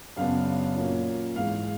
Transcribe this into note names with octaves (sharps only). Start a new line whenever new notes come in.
F#2 C#3 F#3 B3 D4 F5
A#2 F#3 A#3 C#4
G#2 E3 G#3 F5